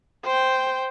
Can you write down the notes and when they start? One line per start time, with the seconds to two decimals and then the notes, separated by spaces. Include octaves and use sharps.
0.24 C5 G5